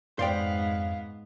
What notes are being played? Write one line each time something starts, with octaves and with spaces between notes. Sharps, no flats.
F2 G#2 B3 C5 D5 F5 G5